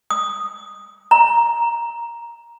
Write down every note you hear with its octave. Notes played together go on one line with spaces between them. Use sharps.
D#6
A#5